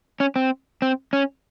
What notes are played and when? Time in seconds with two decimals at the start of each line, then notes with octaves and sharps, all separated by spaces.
0.20 C#4
0.36 C4
0.82 C4
1.13 C#4